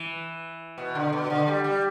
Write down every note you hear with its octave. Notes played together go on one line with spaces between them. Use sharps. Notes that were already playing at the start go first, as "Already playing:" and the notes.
Already playing: E3
B2
D3
B2
D3
G3
G3